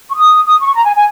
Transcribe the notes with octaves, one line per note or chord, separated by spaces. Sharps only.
C#6
D#6
D#6
C#6
A#5
G#5
G#5